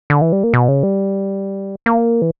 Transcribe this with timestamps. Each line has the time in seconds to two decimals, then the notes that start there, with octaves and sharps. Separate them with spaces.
0.10 D3
0.21 E3
0.32 G3
0.44 A#3
0.54 B2
0.68 C#3
0.83 G3
1.86 A#3
2.22 E3